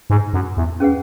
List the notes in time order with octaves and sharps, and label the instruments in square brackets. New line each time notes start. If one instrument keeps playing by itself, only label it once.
[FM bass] G#2
F#2
E2
[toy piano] C#4 G#4 B4 F#5